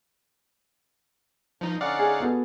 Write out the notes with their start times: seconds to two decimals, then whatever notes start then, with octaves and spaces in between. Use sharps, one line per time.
1.61 G2 F3 D#4
1.81 D3 C#4 D#4 D5 F5 F#5
1.99 G#4
2.20 B3 F#4 A4